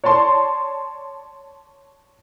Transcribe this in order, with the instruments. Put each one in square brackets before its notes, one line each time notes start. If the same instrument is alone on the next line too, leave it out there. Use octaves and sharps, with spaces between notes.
[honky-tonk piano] C#5 D5 A5 C6